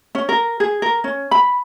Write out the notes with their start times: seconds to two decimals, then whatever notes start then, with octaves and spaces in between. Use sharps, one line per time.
0.15 C#4
0.29 A#4
0.60 G#4
0.82 A#4
1.04 C#4
1.31 B5